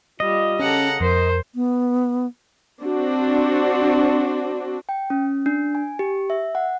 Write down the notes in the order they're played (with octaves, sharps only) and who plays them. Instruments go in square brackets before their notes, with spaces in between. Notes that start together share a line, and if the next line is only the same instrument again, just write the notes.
[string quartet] G3 [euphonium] F4 [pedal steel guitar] D#5
[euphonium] C#3 [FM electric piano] C#4 [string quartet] A4 F#5 A#5
[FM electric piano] F2 [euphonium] A#4 [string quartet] C5
[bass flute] B3
[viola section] C4 D4 F#4
[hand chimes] G5
C#4
D4
G#5
G4
E5
F#5